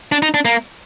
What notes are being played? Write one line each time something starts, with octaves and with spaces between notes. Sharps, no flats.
D4
D#4
D4
A#3